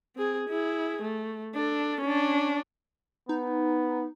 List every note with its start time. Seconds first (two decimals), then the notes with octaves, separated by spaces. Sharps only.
0.16 C4 G#4
0.49 E4 G#4
1.02 A3
1.55 D4 A4
2.01 C#4 D4
3.29 B3 D#4